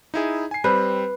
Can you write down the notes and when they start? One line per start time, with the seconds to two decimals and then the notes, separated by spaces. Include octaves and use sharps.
0.14 D#4 E4 G#4
0.51 G#5 C7
0.64 G3 C4 B4 C5